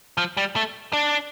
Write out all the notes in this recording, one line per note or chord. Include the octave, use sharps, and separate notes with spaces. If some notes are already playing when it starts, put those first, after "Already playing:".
F3
G3
A3
D4